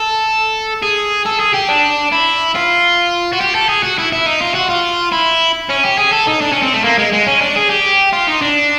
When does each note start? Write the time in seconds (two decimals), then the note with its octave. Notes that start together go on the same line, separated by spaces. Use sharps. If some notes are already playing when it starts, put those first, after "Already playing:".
Already playing: A4
0.83 G#4
1.26 A4
1.40 G#4
1.54 G4
1.69 D4
2.12 E4
2.55 F4
3.33 F#4
3.41 G4
3.55 A4
3.69 G#4
3.83 F#4
3.98 E4
4.12 E4
4.26 D#4
4.41 F4
4.55 F#4
4.70 F4
5.12 E4
5.70 C#4
5.84 G4
5.99 G#4
6.13 A4
6.27 D#4
6.41 D4
6.52 C#4
6.62 C4
6.74 A3
6.84 A#3
6.99 G#3
7.13 G#3
7.27 C#4
7.42 D4
7.56 G#4
7.70 G4
8.13 F4
8.27 D#4
8.42 D4